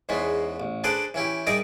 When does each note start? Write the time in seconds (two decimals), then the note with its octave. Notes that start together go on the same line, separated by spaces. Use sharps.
0.09 E2 G#2 G#3 B3 C#4
0.60 A1
0.84 D4 G#4 A4 B4 C5 D5
1.14 E3 C#4 E4 G4
1.47 G3 D#4 G#4 A#4 D5 E5